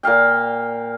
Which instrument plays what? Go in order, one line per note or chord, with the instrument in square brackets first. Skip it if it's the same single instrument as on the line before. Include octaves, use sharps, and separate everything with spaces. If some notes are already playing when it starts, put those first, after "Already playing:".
[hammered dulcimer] A#2 A#4 F5 G5